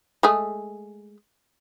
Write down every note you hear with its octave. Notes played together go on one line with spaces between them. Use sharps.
G#3 A3 G#4